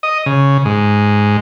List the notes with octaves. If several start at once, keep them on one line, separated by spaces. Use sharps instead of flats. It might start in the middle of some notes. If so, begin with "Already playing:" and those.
D#5
C#3
G#2